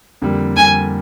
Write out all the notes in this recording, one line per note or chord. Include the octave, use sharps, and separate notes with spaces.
F2 D3 G3 A#3
F2 D3 G3 A#3 G#5